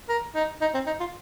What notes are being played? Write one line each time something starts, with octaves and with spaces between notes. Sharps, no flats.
A#4
D#4
D#4
C4
D#4
F4